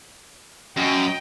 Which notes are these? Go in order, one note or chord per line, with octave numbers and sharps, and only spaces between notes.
F#2 D#5 G5